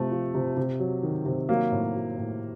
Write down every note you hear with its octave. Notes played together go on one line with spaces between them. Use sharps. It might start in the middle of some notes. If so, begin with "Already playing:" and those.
Already playing: C3 F3 A3
F3
C3
C3
F#3
D#3
C3
F#3 A#3
A2
F#3
A2